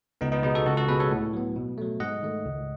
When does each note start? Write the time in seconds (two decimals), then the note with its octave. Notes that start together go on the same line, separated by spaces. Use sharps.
0.21 C#2 B3 D#4
0.32 B3 D#4
0.43 B2 G#3 B3 D#4
0.55 F#4 A4
0.66 C#2 F#4 A4
0.77 F#4 A4
0.88 B2 G#3 B3 G#4 B4
0.99 A4 C#5
1.11 A2
1.33 F#3 B3
1.56 B2
1.78 F#3 A3
2.00 G#2 D#5 F#5
2.23 D#3 A3
2.45 C#2